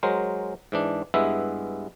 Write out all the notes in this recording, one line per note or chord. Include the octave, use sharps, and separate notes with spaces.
F#3 G#3 A#4 C5
G#2 E3 D4
G2 G#3 B3 E4 E5